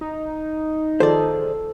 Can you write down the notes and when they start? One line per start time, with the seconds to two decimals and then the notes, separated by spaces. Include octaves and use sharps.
0.01 D#4
1.00 D#3 F3 G#4 A4 C5 D5